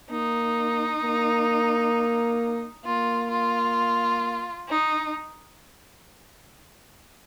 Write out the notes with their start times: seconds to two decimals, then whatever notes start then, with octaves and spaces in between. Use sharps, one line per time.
0.11 A#3 D#4
1.03 A#3
2.85 A#3 F4
3.31 F4
4.69 D#4